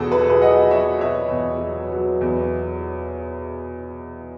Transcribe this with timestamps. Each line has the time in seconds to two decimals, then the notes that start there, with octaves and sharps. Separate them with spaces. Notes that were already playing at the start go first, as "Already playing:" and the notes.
Already playing: E2 B2 F#4 G#4 A4
0.11 F#3 B4
0.21 A4
0.29 G#4 B4
0.41 F#3 D#5 F#5
0.71 F#3 C#5 E5
1.01 B2 C#5 E5
1.31 E2
1.61 F#3
1.92 F#3
2.21 E2